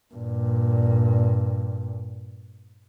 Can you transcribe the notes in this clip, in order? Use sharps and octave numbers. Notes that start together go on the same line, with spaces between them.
G2 A#2